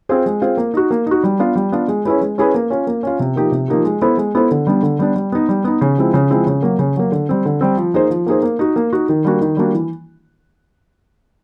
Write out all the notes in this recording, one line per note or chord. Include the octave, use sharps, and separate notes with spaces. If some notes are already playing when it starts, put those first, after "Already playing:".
C4 F4 G#4 C5
G#3
C4 F4 G#4 C5
A#3
D#4 F#4
A#3
D#4 F#4
G3
B3 D4 F4
G3
B3 D4 F4
G#3
C#4 E4 G#4 B4
G#3
C#4 E4 G#4 B4
A#3
C#4 F4
A#3
C#4 F4
C3
F3 A#3 D#4 G4
C3
F3 A#3 D#4 G4
G#3
B3 E4 A4 C5
G#3
B3 E4 A4 C5
D3
G3 B3 D4
D3
G3 B3 D4
G3
B3 D#4
G3
B3 D#4
C#3
F3 G#3 C4 E4
C#3
F3 G#3 C4 E4
C#3
F#3 A#3
C#3
F#3 A#3
D3
G3 C4
D3
G3 C4
F3
A#3 D#4 G#4 C5
F3
A#3 D#4 G#4 C5
A#3
D#4 F#4
A#3
D#4 F#4
D#3
G3 A#3 D4 F#4
D#3
G3 A#3 D4 F#4
E3